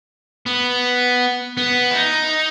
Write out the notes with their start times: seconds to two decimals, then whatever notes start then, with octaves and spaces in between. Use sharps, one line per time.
0.46 B3
1.57 B3
1.91 E4
1.95 D#4